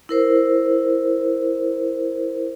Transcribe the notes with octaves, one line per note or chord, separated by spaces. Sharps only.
E4 A#4 C5